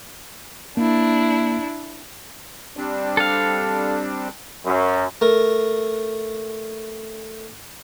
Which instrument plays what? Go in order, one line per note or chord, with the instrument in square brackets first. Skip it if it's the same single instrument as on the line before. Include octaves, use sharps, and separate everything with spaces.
[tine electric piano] A#3 [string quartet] D4 E4
[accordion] G3 C4 D4
[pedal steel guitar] A4 F5
[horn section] F#2
[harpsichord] A3 A#4